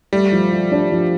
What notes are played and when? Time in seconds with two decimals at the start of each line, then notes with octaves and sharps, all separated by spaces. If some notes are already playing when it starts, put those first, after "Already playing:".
0.13 G3 A3
0.32 F3
0.52 A3
0.72 D4
0.92 F3